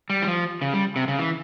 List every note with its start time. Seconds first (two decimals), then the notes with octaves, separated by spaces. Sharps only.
0.10 G3
0.22 E3
0.27 F3
0.62 C#3
0.74 G3
0.96 C3
1.08 C#3
1.19 E3